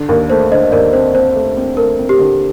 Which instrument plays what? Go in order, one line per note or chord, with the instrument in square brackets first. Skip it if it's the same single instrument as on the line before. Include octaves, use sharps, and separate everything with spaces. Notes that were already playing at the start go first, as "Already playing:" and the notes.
Already playing: [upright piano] D3
[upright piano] D#2 [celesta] A#4
[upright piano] A3 [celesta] C5
[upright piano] D3 [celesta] C5 D#5
[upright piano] D#2 [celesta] A#4 D5
[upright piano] C4 [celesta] C5
[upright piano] C4 [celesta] C5
[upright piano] A3
C4
[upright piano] A3 [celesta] A#4
[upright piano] C4
[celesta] G4
[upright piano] D3